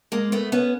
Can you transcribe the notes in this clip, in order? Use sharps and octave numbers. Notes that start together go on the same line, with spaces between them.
G#3 A#3
A3 B3
B3 C#4